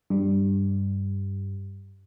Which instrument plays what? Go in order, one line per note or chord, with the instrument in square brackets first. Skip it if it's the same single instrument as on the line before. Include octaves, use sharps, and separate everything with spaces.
[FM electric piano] G2 G3